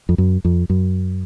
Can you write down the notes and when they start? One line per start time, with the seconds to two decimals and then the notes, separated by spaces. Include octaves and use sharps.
0.09 F2
0.18 F#2
0.45 F2
0.70 F#2